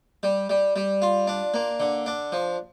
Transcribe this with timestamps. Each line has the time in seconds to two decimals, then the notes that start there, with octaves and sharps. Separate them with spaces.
0.23 G3
0.50 G3
0.76 G3
1.02 F4
1.27 D4
1.54 A#3
1.80 D3
2.06 D4
2.32 F3